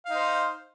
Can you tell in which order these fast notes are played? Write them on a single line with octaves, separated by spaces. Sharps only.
F5 D#4 C5